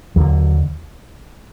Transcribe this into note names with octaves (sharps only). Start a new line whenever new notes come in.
D#2 D3 F#3